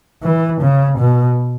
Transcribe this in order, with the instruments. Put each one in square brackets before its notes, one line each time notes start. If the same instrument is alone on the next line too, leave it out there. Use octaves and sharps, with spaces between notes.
[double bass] E3
C#3
B2